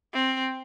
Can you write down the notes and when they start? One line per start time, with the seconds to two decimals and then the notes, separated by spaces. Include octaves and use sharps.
0.14 C4